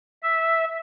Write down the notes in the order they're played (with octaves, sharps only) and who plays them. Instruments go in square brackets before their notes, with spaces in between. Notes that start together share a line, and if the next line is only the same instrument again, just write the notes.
[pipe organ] E5